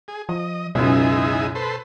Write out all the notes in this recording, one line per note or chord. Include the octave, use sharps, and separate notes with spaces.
G#4
F3 D#5
C#2 F#2 B2 D#4 E4 G#4
A4 B4 C5